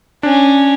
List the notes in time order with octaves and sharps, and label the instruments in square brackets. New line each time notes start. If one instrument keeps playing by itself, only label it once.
[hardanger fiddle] C#4 [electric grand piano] D4